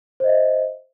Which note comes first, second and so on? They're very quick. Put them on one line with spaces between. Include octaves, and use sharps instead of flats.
C5 D#5 E5